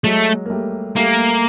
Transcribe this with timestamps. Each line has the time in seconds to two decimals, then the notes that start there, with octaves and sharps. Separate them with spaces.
0.04 F#3 G#3 A3
0.46 A#3
0.50 G3 A3
0.96 G3 A3 A#3